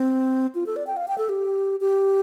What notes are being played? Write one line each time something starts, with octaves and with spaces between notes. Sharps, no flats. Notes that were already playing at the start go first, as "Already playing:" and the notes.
Already playing: C4
F4
A4
D5
G5
F5
G5
A4
G4
G4